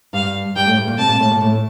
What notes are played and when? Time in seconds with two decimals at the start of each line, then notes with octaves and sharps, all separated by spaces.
0.13 G2 G3 F5
0.56 G2 G3 G5
0.66 A2 A3
0.77 G2 G3
0.88 A#2 A#3
0.98 C3 C4 A5
1.09 A#2 A#3
1.19 A2 A3
1.30 A#2 A#3
1.41 A2 A3